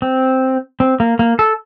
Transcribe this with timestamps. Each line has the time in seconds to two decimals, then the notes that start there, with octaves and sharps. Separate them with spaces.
0.02 C4
0.80 C4
1.00 A#3
1.19 A#3
1.39 A4